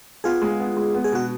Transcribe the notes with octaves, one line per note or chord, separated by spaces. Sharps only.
B3 F4 G#4
G#3
B3
G#3
B3
G#4
B2 F#4